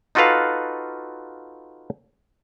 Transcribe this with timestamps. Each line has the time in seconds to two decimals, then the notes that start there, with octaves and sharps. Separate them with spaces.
0.15 D#4 F4 F#4 A4 B4 F5